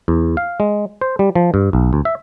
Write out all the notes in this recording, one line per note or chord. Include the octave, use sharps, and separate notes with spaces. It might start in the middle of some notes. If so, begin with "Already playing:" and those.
E2
F5
G#3
C5
G3
F3
G2
B1
D2
E5